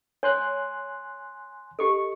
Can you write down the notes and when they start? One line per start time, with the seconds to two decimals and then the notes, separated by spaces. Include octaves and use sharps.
0.23 C#5 G#5 C6 F#6
1.79 G4 A4 D#5 C#6